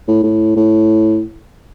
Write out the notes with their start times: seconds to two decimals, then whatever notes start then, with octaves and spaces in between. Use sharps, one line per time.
0.08 A2
0.24 A2
0.56 A2